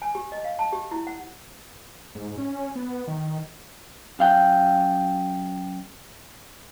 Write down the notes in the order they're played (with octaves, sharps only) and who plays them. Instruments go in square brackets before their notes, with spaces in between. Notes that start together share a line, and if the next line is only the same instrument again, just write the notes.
[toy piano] G#5
G4
D#5
F5
A5
G4
E4
F#5
[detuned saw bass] G#2
C#4
B3
D#3
[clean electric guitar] F#2 F5 G5